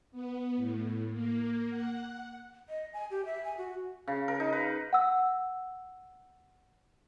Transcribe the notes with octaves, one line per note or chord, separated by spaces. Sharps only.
B3
A2
A#3
F#5
D#5
G#5
G4
E5
G#5
F#4
C#3
A#4
D#4
B4
F#5 E6